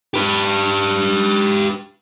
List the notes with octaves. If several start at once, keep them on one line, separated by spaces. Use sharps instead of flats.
G4 B4